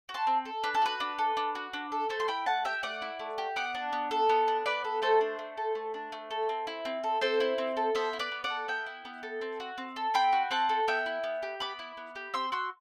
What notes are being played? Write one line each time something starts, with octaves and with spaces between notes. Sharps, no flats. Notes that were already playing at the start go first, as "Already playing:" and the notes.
F#4
A5 C6
C4
A4
D4 B4
A4
F#4 B4
D4
A4
D4
F#4
D4
A4
A3 A4 C5
C6
E4 G5 B5
A3 F#5 A5
G4 E5 G5
A3 D5 F#5
E4
A3
G4
B3 D5 F#5
D4
B3
A4
B3
D4
B3 B4 D5
A4
A3 A4 C5
D4
A3
A4
A3
D4
A3
A4
C4
E4
C4
A4
C4 A4 C5
E4
C4
A4
B3 C5 E5
E4
B4 D5
B3
D5 F#5
A4
B3 E5 G5
E4
B3
A4
C4
F#4
C4
A4
C4 G5 B5
F#4
C4 F#5 A5
A4
B3 E5 G5
E4
B3
G4
B3 B5 D6
E4
B3
G4
C4 C6 E6
F#4 C6 E6